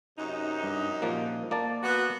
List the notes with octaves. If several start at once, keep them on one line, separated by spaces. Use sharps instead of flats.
F#2 C3 D#4
G2
A#2 F3 A#3
A#3 D5 A5
B3 F#4